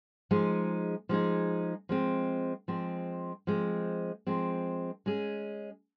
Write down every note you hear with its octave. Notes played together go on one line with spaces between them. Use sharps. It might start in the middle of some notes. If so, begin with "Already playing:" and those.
F3 G#3 D#4 G#4
F3 G#3 D#4 G#4
F3 G#3 C4
F3 G#3 C4
F3 G#3 C4
F3 G#3 C4
G#3 C#4 G#4